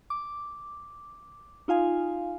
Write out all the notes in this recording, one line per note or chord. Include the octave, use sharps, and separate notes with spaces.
D6
D#4 F4 F5 G#5